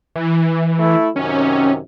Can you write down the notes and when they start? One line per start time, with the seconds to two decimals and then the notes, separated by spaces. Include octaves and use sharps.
0.16 E3
0.79 A3 E4
1.16 F#2 C3 D#3 C#4